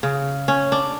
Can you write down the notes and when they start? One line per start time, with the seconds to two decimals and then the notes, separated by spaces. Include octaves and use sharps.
0.03 C#3
0.48 C#4
0.72 D4